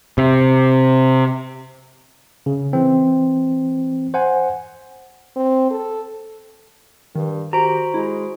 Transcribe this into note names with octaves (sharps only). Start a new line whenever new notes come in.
C3
C#3
E3 C4
C5 F#5 G#5
C4
A4
G2 D#3
F#4 G4 C5 A#5 D7
G#3 E4